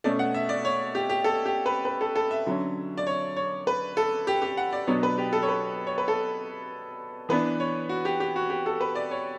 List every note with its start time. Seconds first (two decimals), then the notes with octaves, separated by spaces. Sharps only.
0.04 B2 A3 C#4 D5
0.19 F#5
0.34 E5
0.49 D5
0.65 C#5
0.95 G4
1.09 G4
1.24 A4
1.45 G4
1.66 B4
1.85 B4
2.01 A4
2.15 A4
2.31 E5
2.46 D3 F#3 C#4
2.97 D5
3.07 C#5
3.37 C#5
3.67 B4
3.97 A4
4.27 G4
4.42 G4
4.57 F#5
4.72 D5
4.87 B2 F#3 B3 D4 C#5
5.03 B4
5.18 G4
5.33 A4
5.43 C#5
5.48 B4
5.87 C#5
5.98 B4
6.08 A4
7.29 E3 B3 D4 B4
7.60 C#5
7.89 F#4
8.05 G4
8.20 G4
8.36 F#4
8.50 G4
8.66 A4
8.81 B4
8.95 D5
9.11 C#5